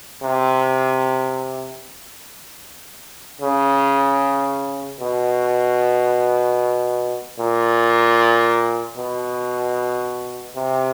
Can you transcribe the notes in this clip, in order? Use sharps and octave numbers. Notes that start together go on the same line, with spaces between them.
C3
C#3
B2
A#2
B2
C3